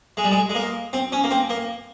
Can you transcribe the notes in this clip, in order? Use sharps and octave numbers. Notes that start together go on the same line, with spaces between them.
G#3
G3
G#3
G#3
A#3
C4
C#4
A#3
C4
A#3